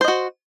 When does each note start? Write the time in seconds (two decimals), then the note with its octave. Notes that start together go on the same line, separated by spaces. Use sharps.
0.01 C5
0.04 D#5
0.08 F#4